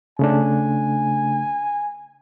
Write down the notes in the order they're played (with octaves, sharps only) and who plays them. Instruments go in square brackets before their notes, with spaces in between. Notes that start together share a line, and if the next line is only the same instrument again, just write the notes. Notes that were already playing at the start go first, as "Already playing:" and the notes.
[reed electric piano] C#3 A3 D4 [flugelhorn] G#5